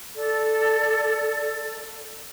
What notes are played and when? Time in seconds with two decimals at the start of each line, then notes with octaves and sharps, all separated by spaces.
0.16 A4 D5